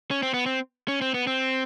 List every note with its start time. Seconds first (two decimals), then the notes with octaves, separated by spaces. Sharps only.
0.11 C#4
0.23 C4
0.34 B3
0.46 C4
0.88 C#4
1.01 C4
1.14 B3
1.27 C4